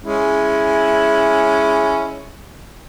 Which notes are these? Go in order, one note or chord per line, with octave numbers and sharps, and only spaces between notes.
G#3 C#4 E4